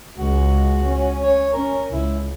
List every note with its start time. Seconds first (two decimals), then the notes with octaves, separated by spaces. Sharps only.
0.17 C#2 G#3 F#4
0.84 C#4
1.23 C#5
1.53 C#4 A#4
1.91 C#2 E4